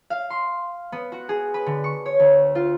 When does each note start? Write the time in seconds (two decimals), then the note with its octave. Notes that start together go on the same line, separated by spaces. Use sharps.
0.10 F5
0.30 C6
0.92 B3
1.12 F#4
1.29 G#4
1.54 B4
1.66 D3
1.84 C#6
2.06 C#5
2.19 D2
2.55 F4